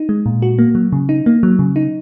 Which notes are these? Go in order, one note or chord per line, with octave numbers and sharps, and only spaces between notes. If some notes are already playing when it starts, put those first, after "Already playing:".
Already playing: D#4
G#3
A#2
F#4
A#3
F#3
C#3
D#4
A#3
F#3
C#3
D#4